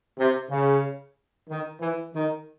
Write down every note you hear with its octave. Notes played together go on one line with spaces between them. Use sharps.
C3
C#3
D#3
E3
D#3